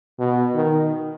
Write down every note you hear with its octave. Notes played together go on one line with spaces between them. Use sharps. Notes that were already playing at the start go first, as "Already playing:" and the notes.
B2
D#3